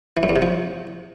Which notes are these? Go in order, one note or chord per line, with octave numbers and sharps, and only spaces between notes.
E3
F#2
E2
C3
F3